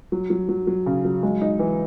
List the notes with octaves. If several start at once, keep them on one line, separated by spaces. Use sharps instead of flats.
F#3
F#3
F#3
F#3
C#3
F#3
G#3
D#4
E3